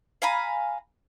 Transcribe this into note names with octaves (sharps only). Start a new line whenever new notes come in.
F5 G#5 A#5 B5